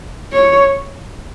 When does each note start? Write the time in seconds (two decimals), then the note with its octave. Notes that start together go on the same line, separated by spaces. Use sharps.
0.33 C#5